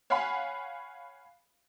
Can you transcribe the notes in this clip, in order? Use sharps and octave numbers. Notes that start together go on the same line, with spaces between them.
C#5 F5 F#5 G#5 B5